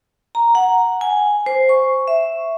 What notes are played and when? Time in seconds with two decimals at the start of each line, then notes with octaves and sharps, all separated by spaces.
0.35 A#5
0.55 F#5
1.01 G#5
1.46 C5
1.69 C#6
2.08 E5